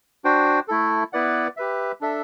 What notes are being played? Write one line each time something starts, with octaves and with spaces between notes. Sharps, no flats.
D4 F#4 C5 G5
A3 E4 A4
B3 E4 B4 D5 F#5
G4 B4 E5
D4 A4 E5